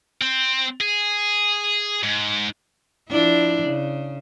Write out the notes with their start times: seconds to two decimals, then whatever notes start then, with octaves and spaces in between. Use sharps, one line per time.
0.22 C4
0.81 G#4
2.03 G#2
3.09 F3 D4 E4
3.63 C#3